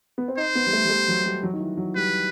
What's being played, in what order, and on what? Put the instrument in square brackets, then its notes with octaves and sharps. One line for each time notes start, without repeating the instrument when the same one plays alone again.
[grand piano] B3
C4
[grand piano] D#4 [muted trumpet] C5
[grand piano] B3
G3
A3
G3
A3
F#3
G3
F#3
D#3
E3
F#3
[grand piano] G3 [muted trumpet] B4